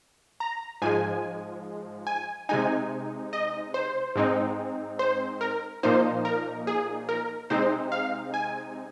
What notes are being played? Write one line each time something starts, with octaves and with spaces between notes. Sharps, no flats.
A#5
G#2 F3 G#3 G#5
G#5
C3 G#3 D#4 G#5
D#5
C5
G#2 G#3 C4 D#4
C5
A#4
A#2 F3 A#3 D#4 C5
A#4
G#4
A#4
C3 G#3 C4 D#4 C5
F5
G#5